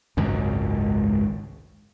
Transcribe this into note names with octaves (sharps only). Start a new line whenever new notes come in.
G#1 C#2 F#2